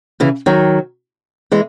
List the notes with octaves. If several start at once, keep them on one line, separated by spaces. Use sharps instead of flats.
C#3 E3
D#3 F#3
E3 G#3